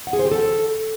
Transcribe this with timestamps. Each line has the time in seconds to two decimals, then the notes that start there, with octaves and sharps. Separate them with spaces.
0.07 F#5
0.13 G#4
0.19 C5
0.25 G4
0.32 A4